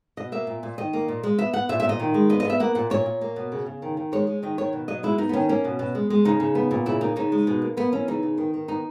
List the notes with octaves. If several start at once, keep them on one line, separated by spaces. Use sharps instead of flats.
B2 D#5
A#3 E5
A#2
A#2
D#3 D#5
A#3
A#2
G#3
B3 E5
B3 F#5
A#2 E5
E5
A#2 D#5
D#3
G#3
B3 D#5
D#5
B3 E5
A#3 F#5
A#2 F#5
A#2 C#5
A#2
A#3
B2
C#3
C#3
D#3
D#3
G#3 C#5
G#3
D#3 D#5
D#3 C#5
B2
F#3 D#5
G#3 E4
B3 D#4
B3
D#3 C#4
A#3 C#4
B2
B2
G#3
G#3
C#3 D#4
C#3
B3
A#2
C#3 E4
A#3 D#4
C#3 D#4
G#3
B2
A#3
A#3 B3
E3 C#4
C#3 D#4
C#3
D#3
D#3
B3 D#4